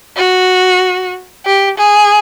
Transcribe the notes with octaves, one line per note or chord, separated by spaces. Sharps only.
F#4
G4
G#4